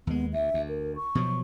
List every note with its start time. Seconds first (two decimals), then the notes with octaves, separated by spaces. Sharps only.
0.07 D#2 G#3 B3
0.33 D2 E5
0.54 D2
0.69 A#4
0.96 C#6
1.15 B2 F3 F#3